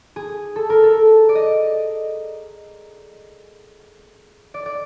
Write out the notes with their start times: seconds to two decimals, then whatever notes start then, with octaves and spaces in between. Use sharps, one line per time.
0.16 G#4
0.56 A4
0.70 A#4
0.84 A4
1.29 D5
1.35 D#5
4.54 D5
4.66 D5